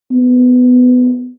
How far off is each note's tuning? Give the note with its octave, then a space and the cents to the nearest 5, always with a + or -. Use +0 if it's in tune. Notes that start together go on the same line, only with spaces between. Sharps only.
B3 +20